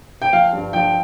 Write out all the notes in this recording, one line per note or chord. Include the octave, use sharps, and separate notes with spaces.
G5
F3 F5
G2
F3 G5